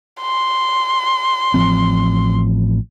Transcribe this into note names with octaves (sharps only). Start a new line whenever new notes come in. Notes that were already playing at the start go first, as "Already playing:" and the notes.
C6
A1 F3 C4